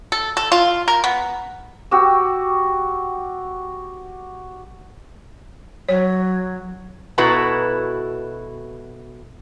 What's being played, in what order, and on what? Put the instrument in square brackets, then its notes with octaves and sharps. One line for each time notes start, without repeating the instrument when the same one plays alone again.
[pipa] A4
A4
F4
A#4
B3
[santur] F#4 G4 E6
[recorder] F#3 [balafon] C#5
[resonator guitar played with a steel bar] B2 E4 F#4 A4 B4 A#5